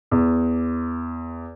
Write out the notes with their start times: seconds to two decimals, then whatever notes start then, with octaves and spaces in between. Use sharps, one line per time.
0.11 E2